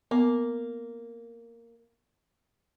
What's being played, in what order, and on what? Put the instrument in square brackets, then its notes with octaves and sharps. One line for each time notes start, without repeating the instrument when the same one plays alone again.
[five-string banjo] A#3 [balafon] B3